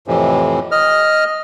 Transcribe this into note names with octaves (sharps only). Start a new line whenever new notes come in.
F2 A2 C3 E3
D#5 F6